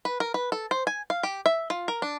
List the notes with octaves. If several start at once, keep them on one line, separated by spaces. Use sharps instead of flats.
B4
A#4
B4
A4
C5
G#5
F5
G4
E5
F4
A#4
D4